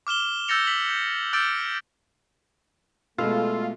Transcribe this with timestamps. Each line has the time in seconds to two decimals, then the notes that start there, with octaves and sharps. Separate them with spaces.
0.07 D6 F6 E7 G7
0.48 E6 G6 A6 A#6 C#7 F7
0.67 B6 F#7
0.89 G6
1.33 D6 E6 F6 G6 A6 D7
3.18 B2 G#3 A3 F4 A4 E6